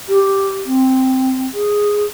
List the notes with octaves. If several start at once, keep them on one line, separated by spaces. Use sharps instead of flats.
G4
C4
G#4